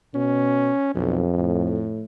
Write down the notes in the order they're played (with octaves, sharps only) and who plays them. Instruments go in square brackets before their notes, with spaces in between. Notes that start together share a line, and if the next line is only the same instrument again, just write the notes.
[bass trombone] B2 [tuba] C#4
[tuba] B1 [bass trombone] F2
[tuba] A2